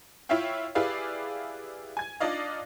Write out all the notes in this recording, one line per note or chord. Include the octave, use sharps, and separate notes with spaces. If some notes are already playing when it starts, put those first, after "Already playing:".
E4 F4 C#5 E5 F5 G5
E4 G4 G#4 B4 D5 F5
G#5 G#6
D4 D#4 F4 D5 D#5 F5